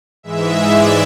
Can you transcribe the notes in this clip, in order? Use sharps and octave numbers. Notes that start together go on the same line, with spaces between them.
G#2 E3 G#3 E5
D5